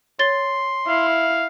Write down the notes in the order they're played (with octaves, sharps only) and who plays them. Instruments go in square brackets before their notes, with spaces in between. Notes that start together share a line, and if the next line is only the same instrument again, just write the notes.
[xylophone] C#5 A6 G7 [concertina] C6
[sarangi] E4 [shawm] F5